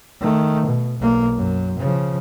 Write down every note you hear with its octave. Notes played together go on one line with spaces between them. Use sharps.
D#3 A3
B2
B1 A#3
F#2
C#3 F3